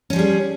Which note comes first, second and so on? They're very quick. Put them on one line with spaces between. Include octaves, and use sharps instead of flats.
C#4 F3 G3 G#4